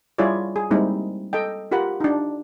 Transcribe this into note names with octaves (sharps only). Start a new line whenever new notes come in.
G3 E4 F4 G#4 C#5 D5
G#4
G3 G#3 A#3 C4 D#4 E4
A4 D#5 G5
F4 G4 A#4 F#5 B5
D4 D#4